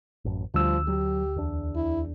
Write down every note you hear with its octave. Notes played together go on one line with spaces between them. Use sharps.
A1 F#2
D2 F3 G3 E6
F#3 G4
E2 D4
E4